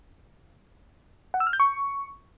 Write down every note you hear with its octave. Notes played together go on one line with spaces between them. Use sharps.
F#5
E6
F6
G6
C#6